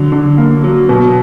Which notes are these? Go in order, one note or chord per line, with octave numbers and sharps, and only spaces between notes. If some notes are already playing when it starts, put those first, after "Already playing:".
Already playing: D3 F#3
D3
A#3
F#3
B2